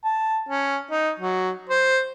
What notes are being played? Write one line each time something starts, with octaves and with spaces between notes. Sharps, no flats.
A5
C#4
D#4
F#3
C5